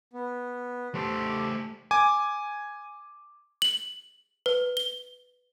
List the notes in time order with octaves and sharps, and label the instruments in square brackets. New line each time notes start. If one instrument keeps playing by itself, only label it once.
[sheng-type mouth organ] B3
[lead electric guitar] A3 C5 [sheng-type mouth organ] G4 A4
[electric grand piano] G#5 D6
[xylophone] F#7
B4
G7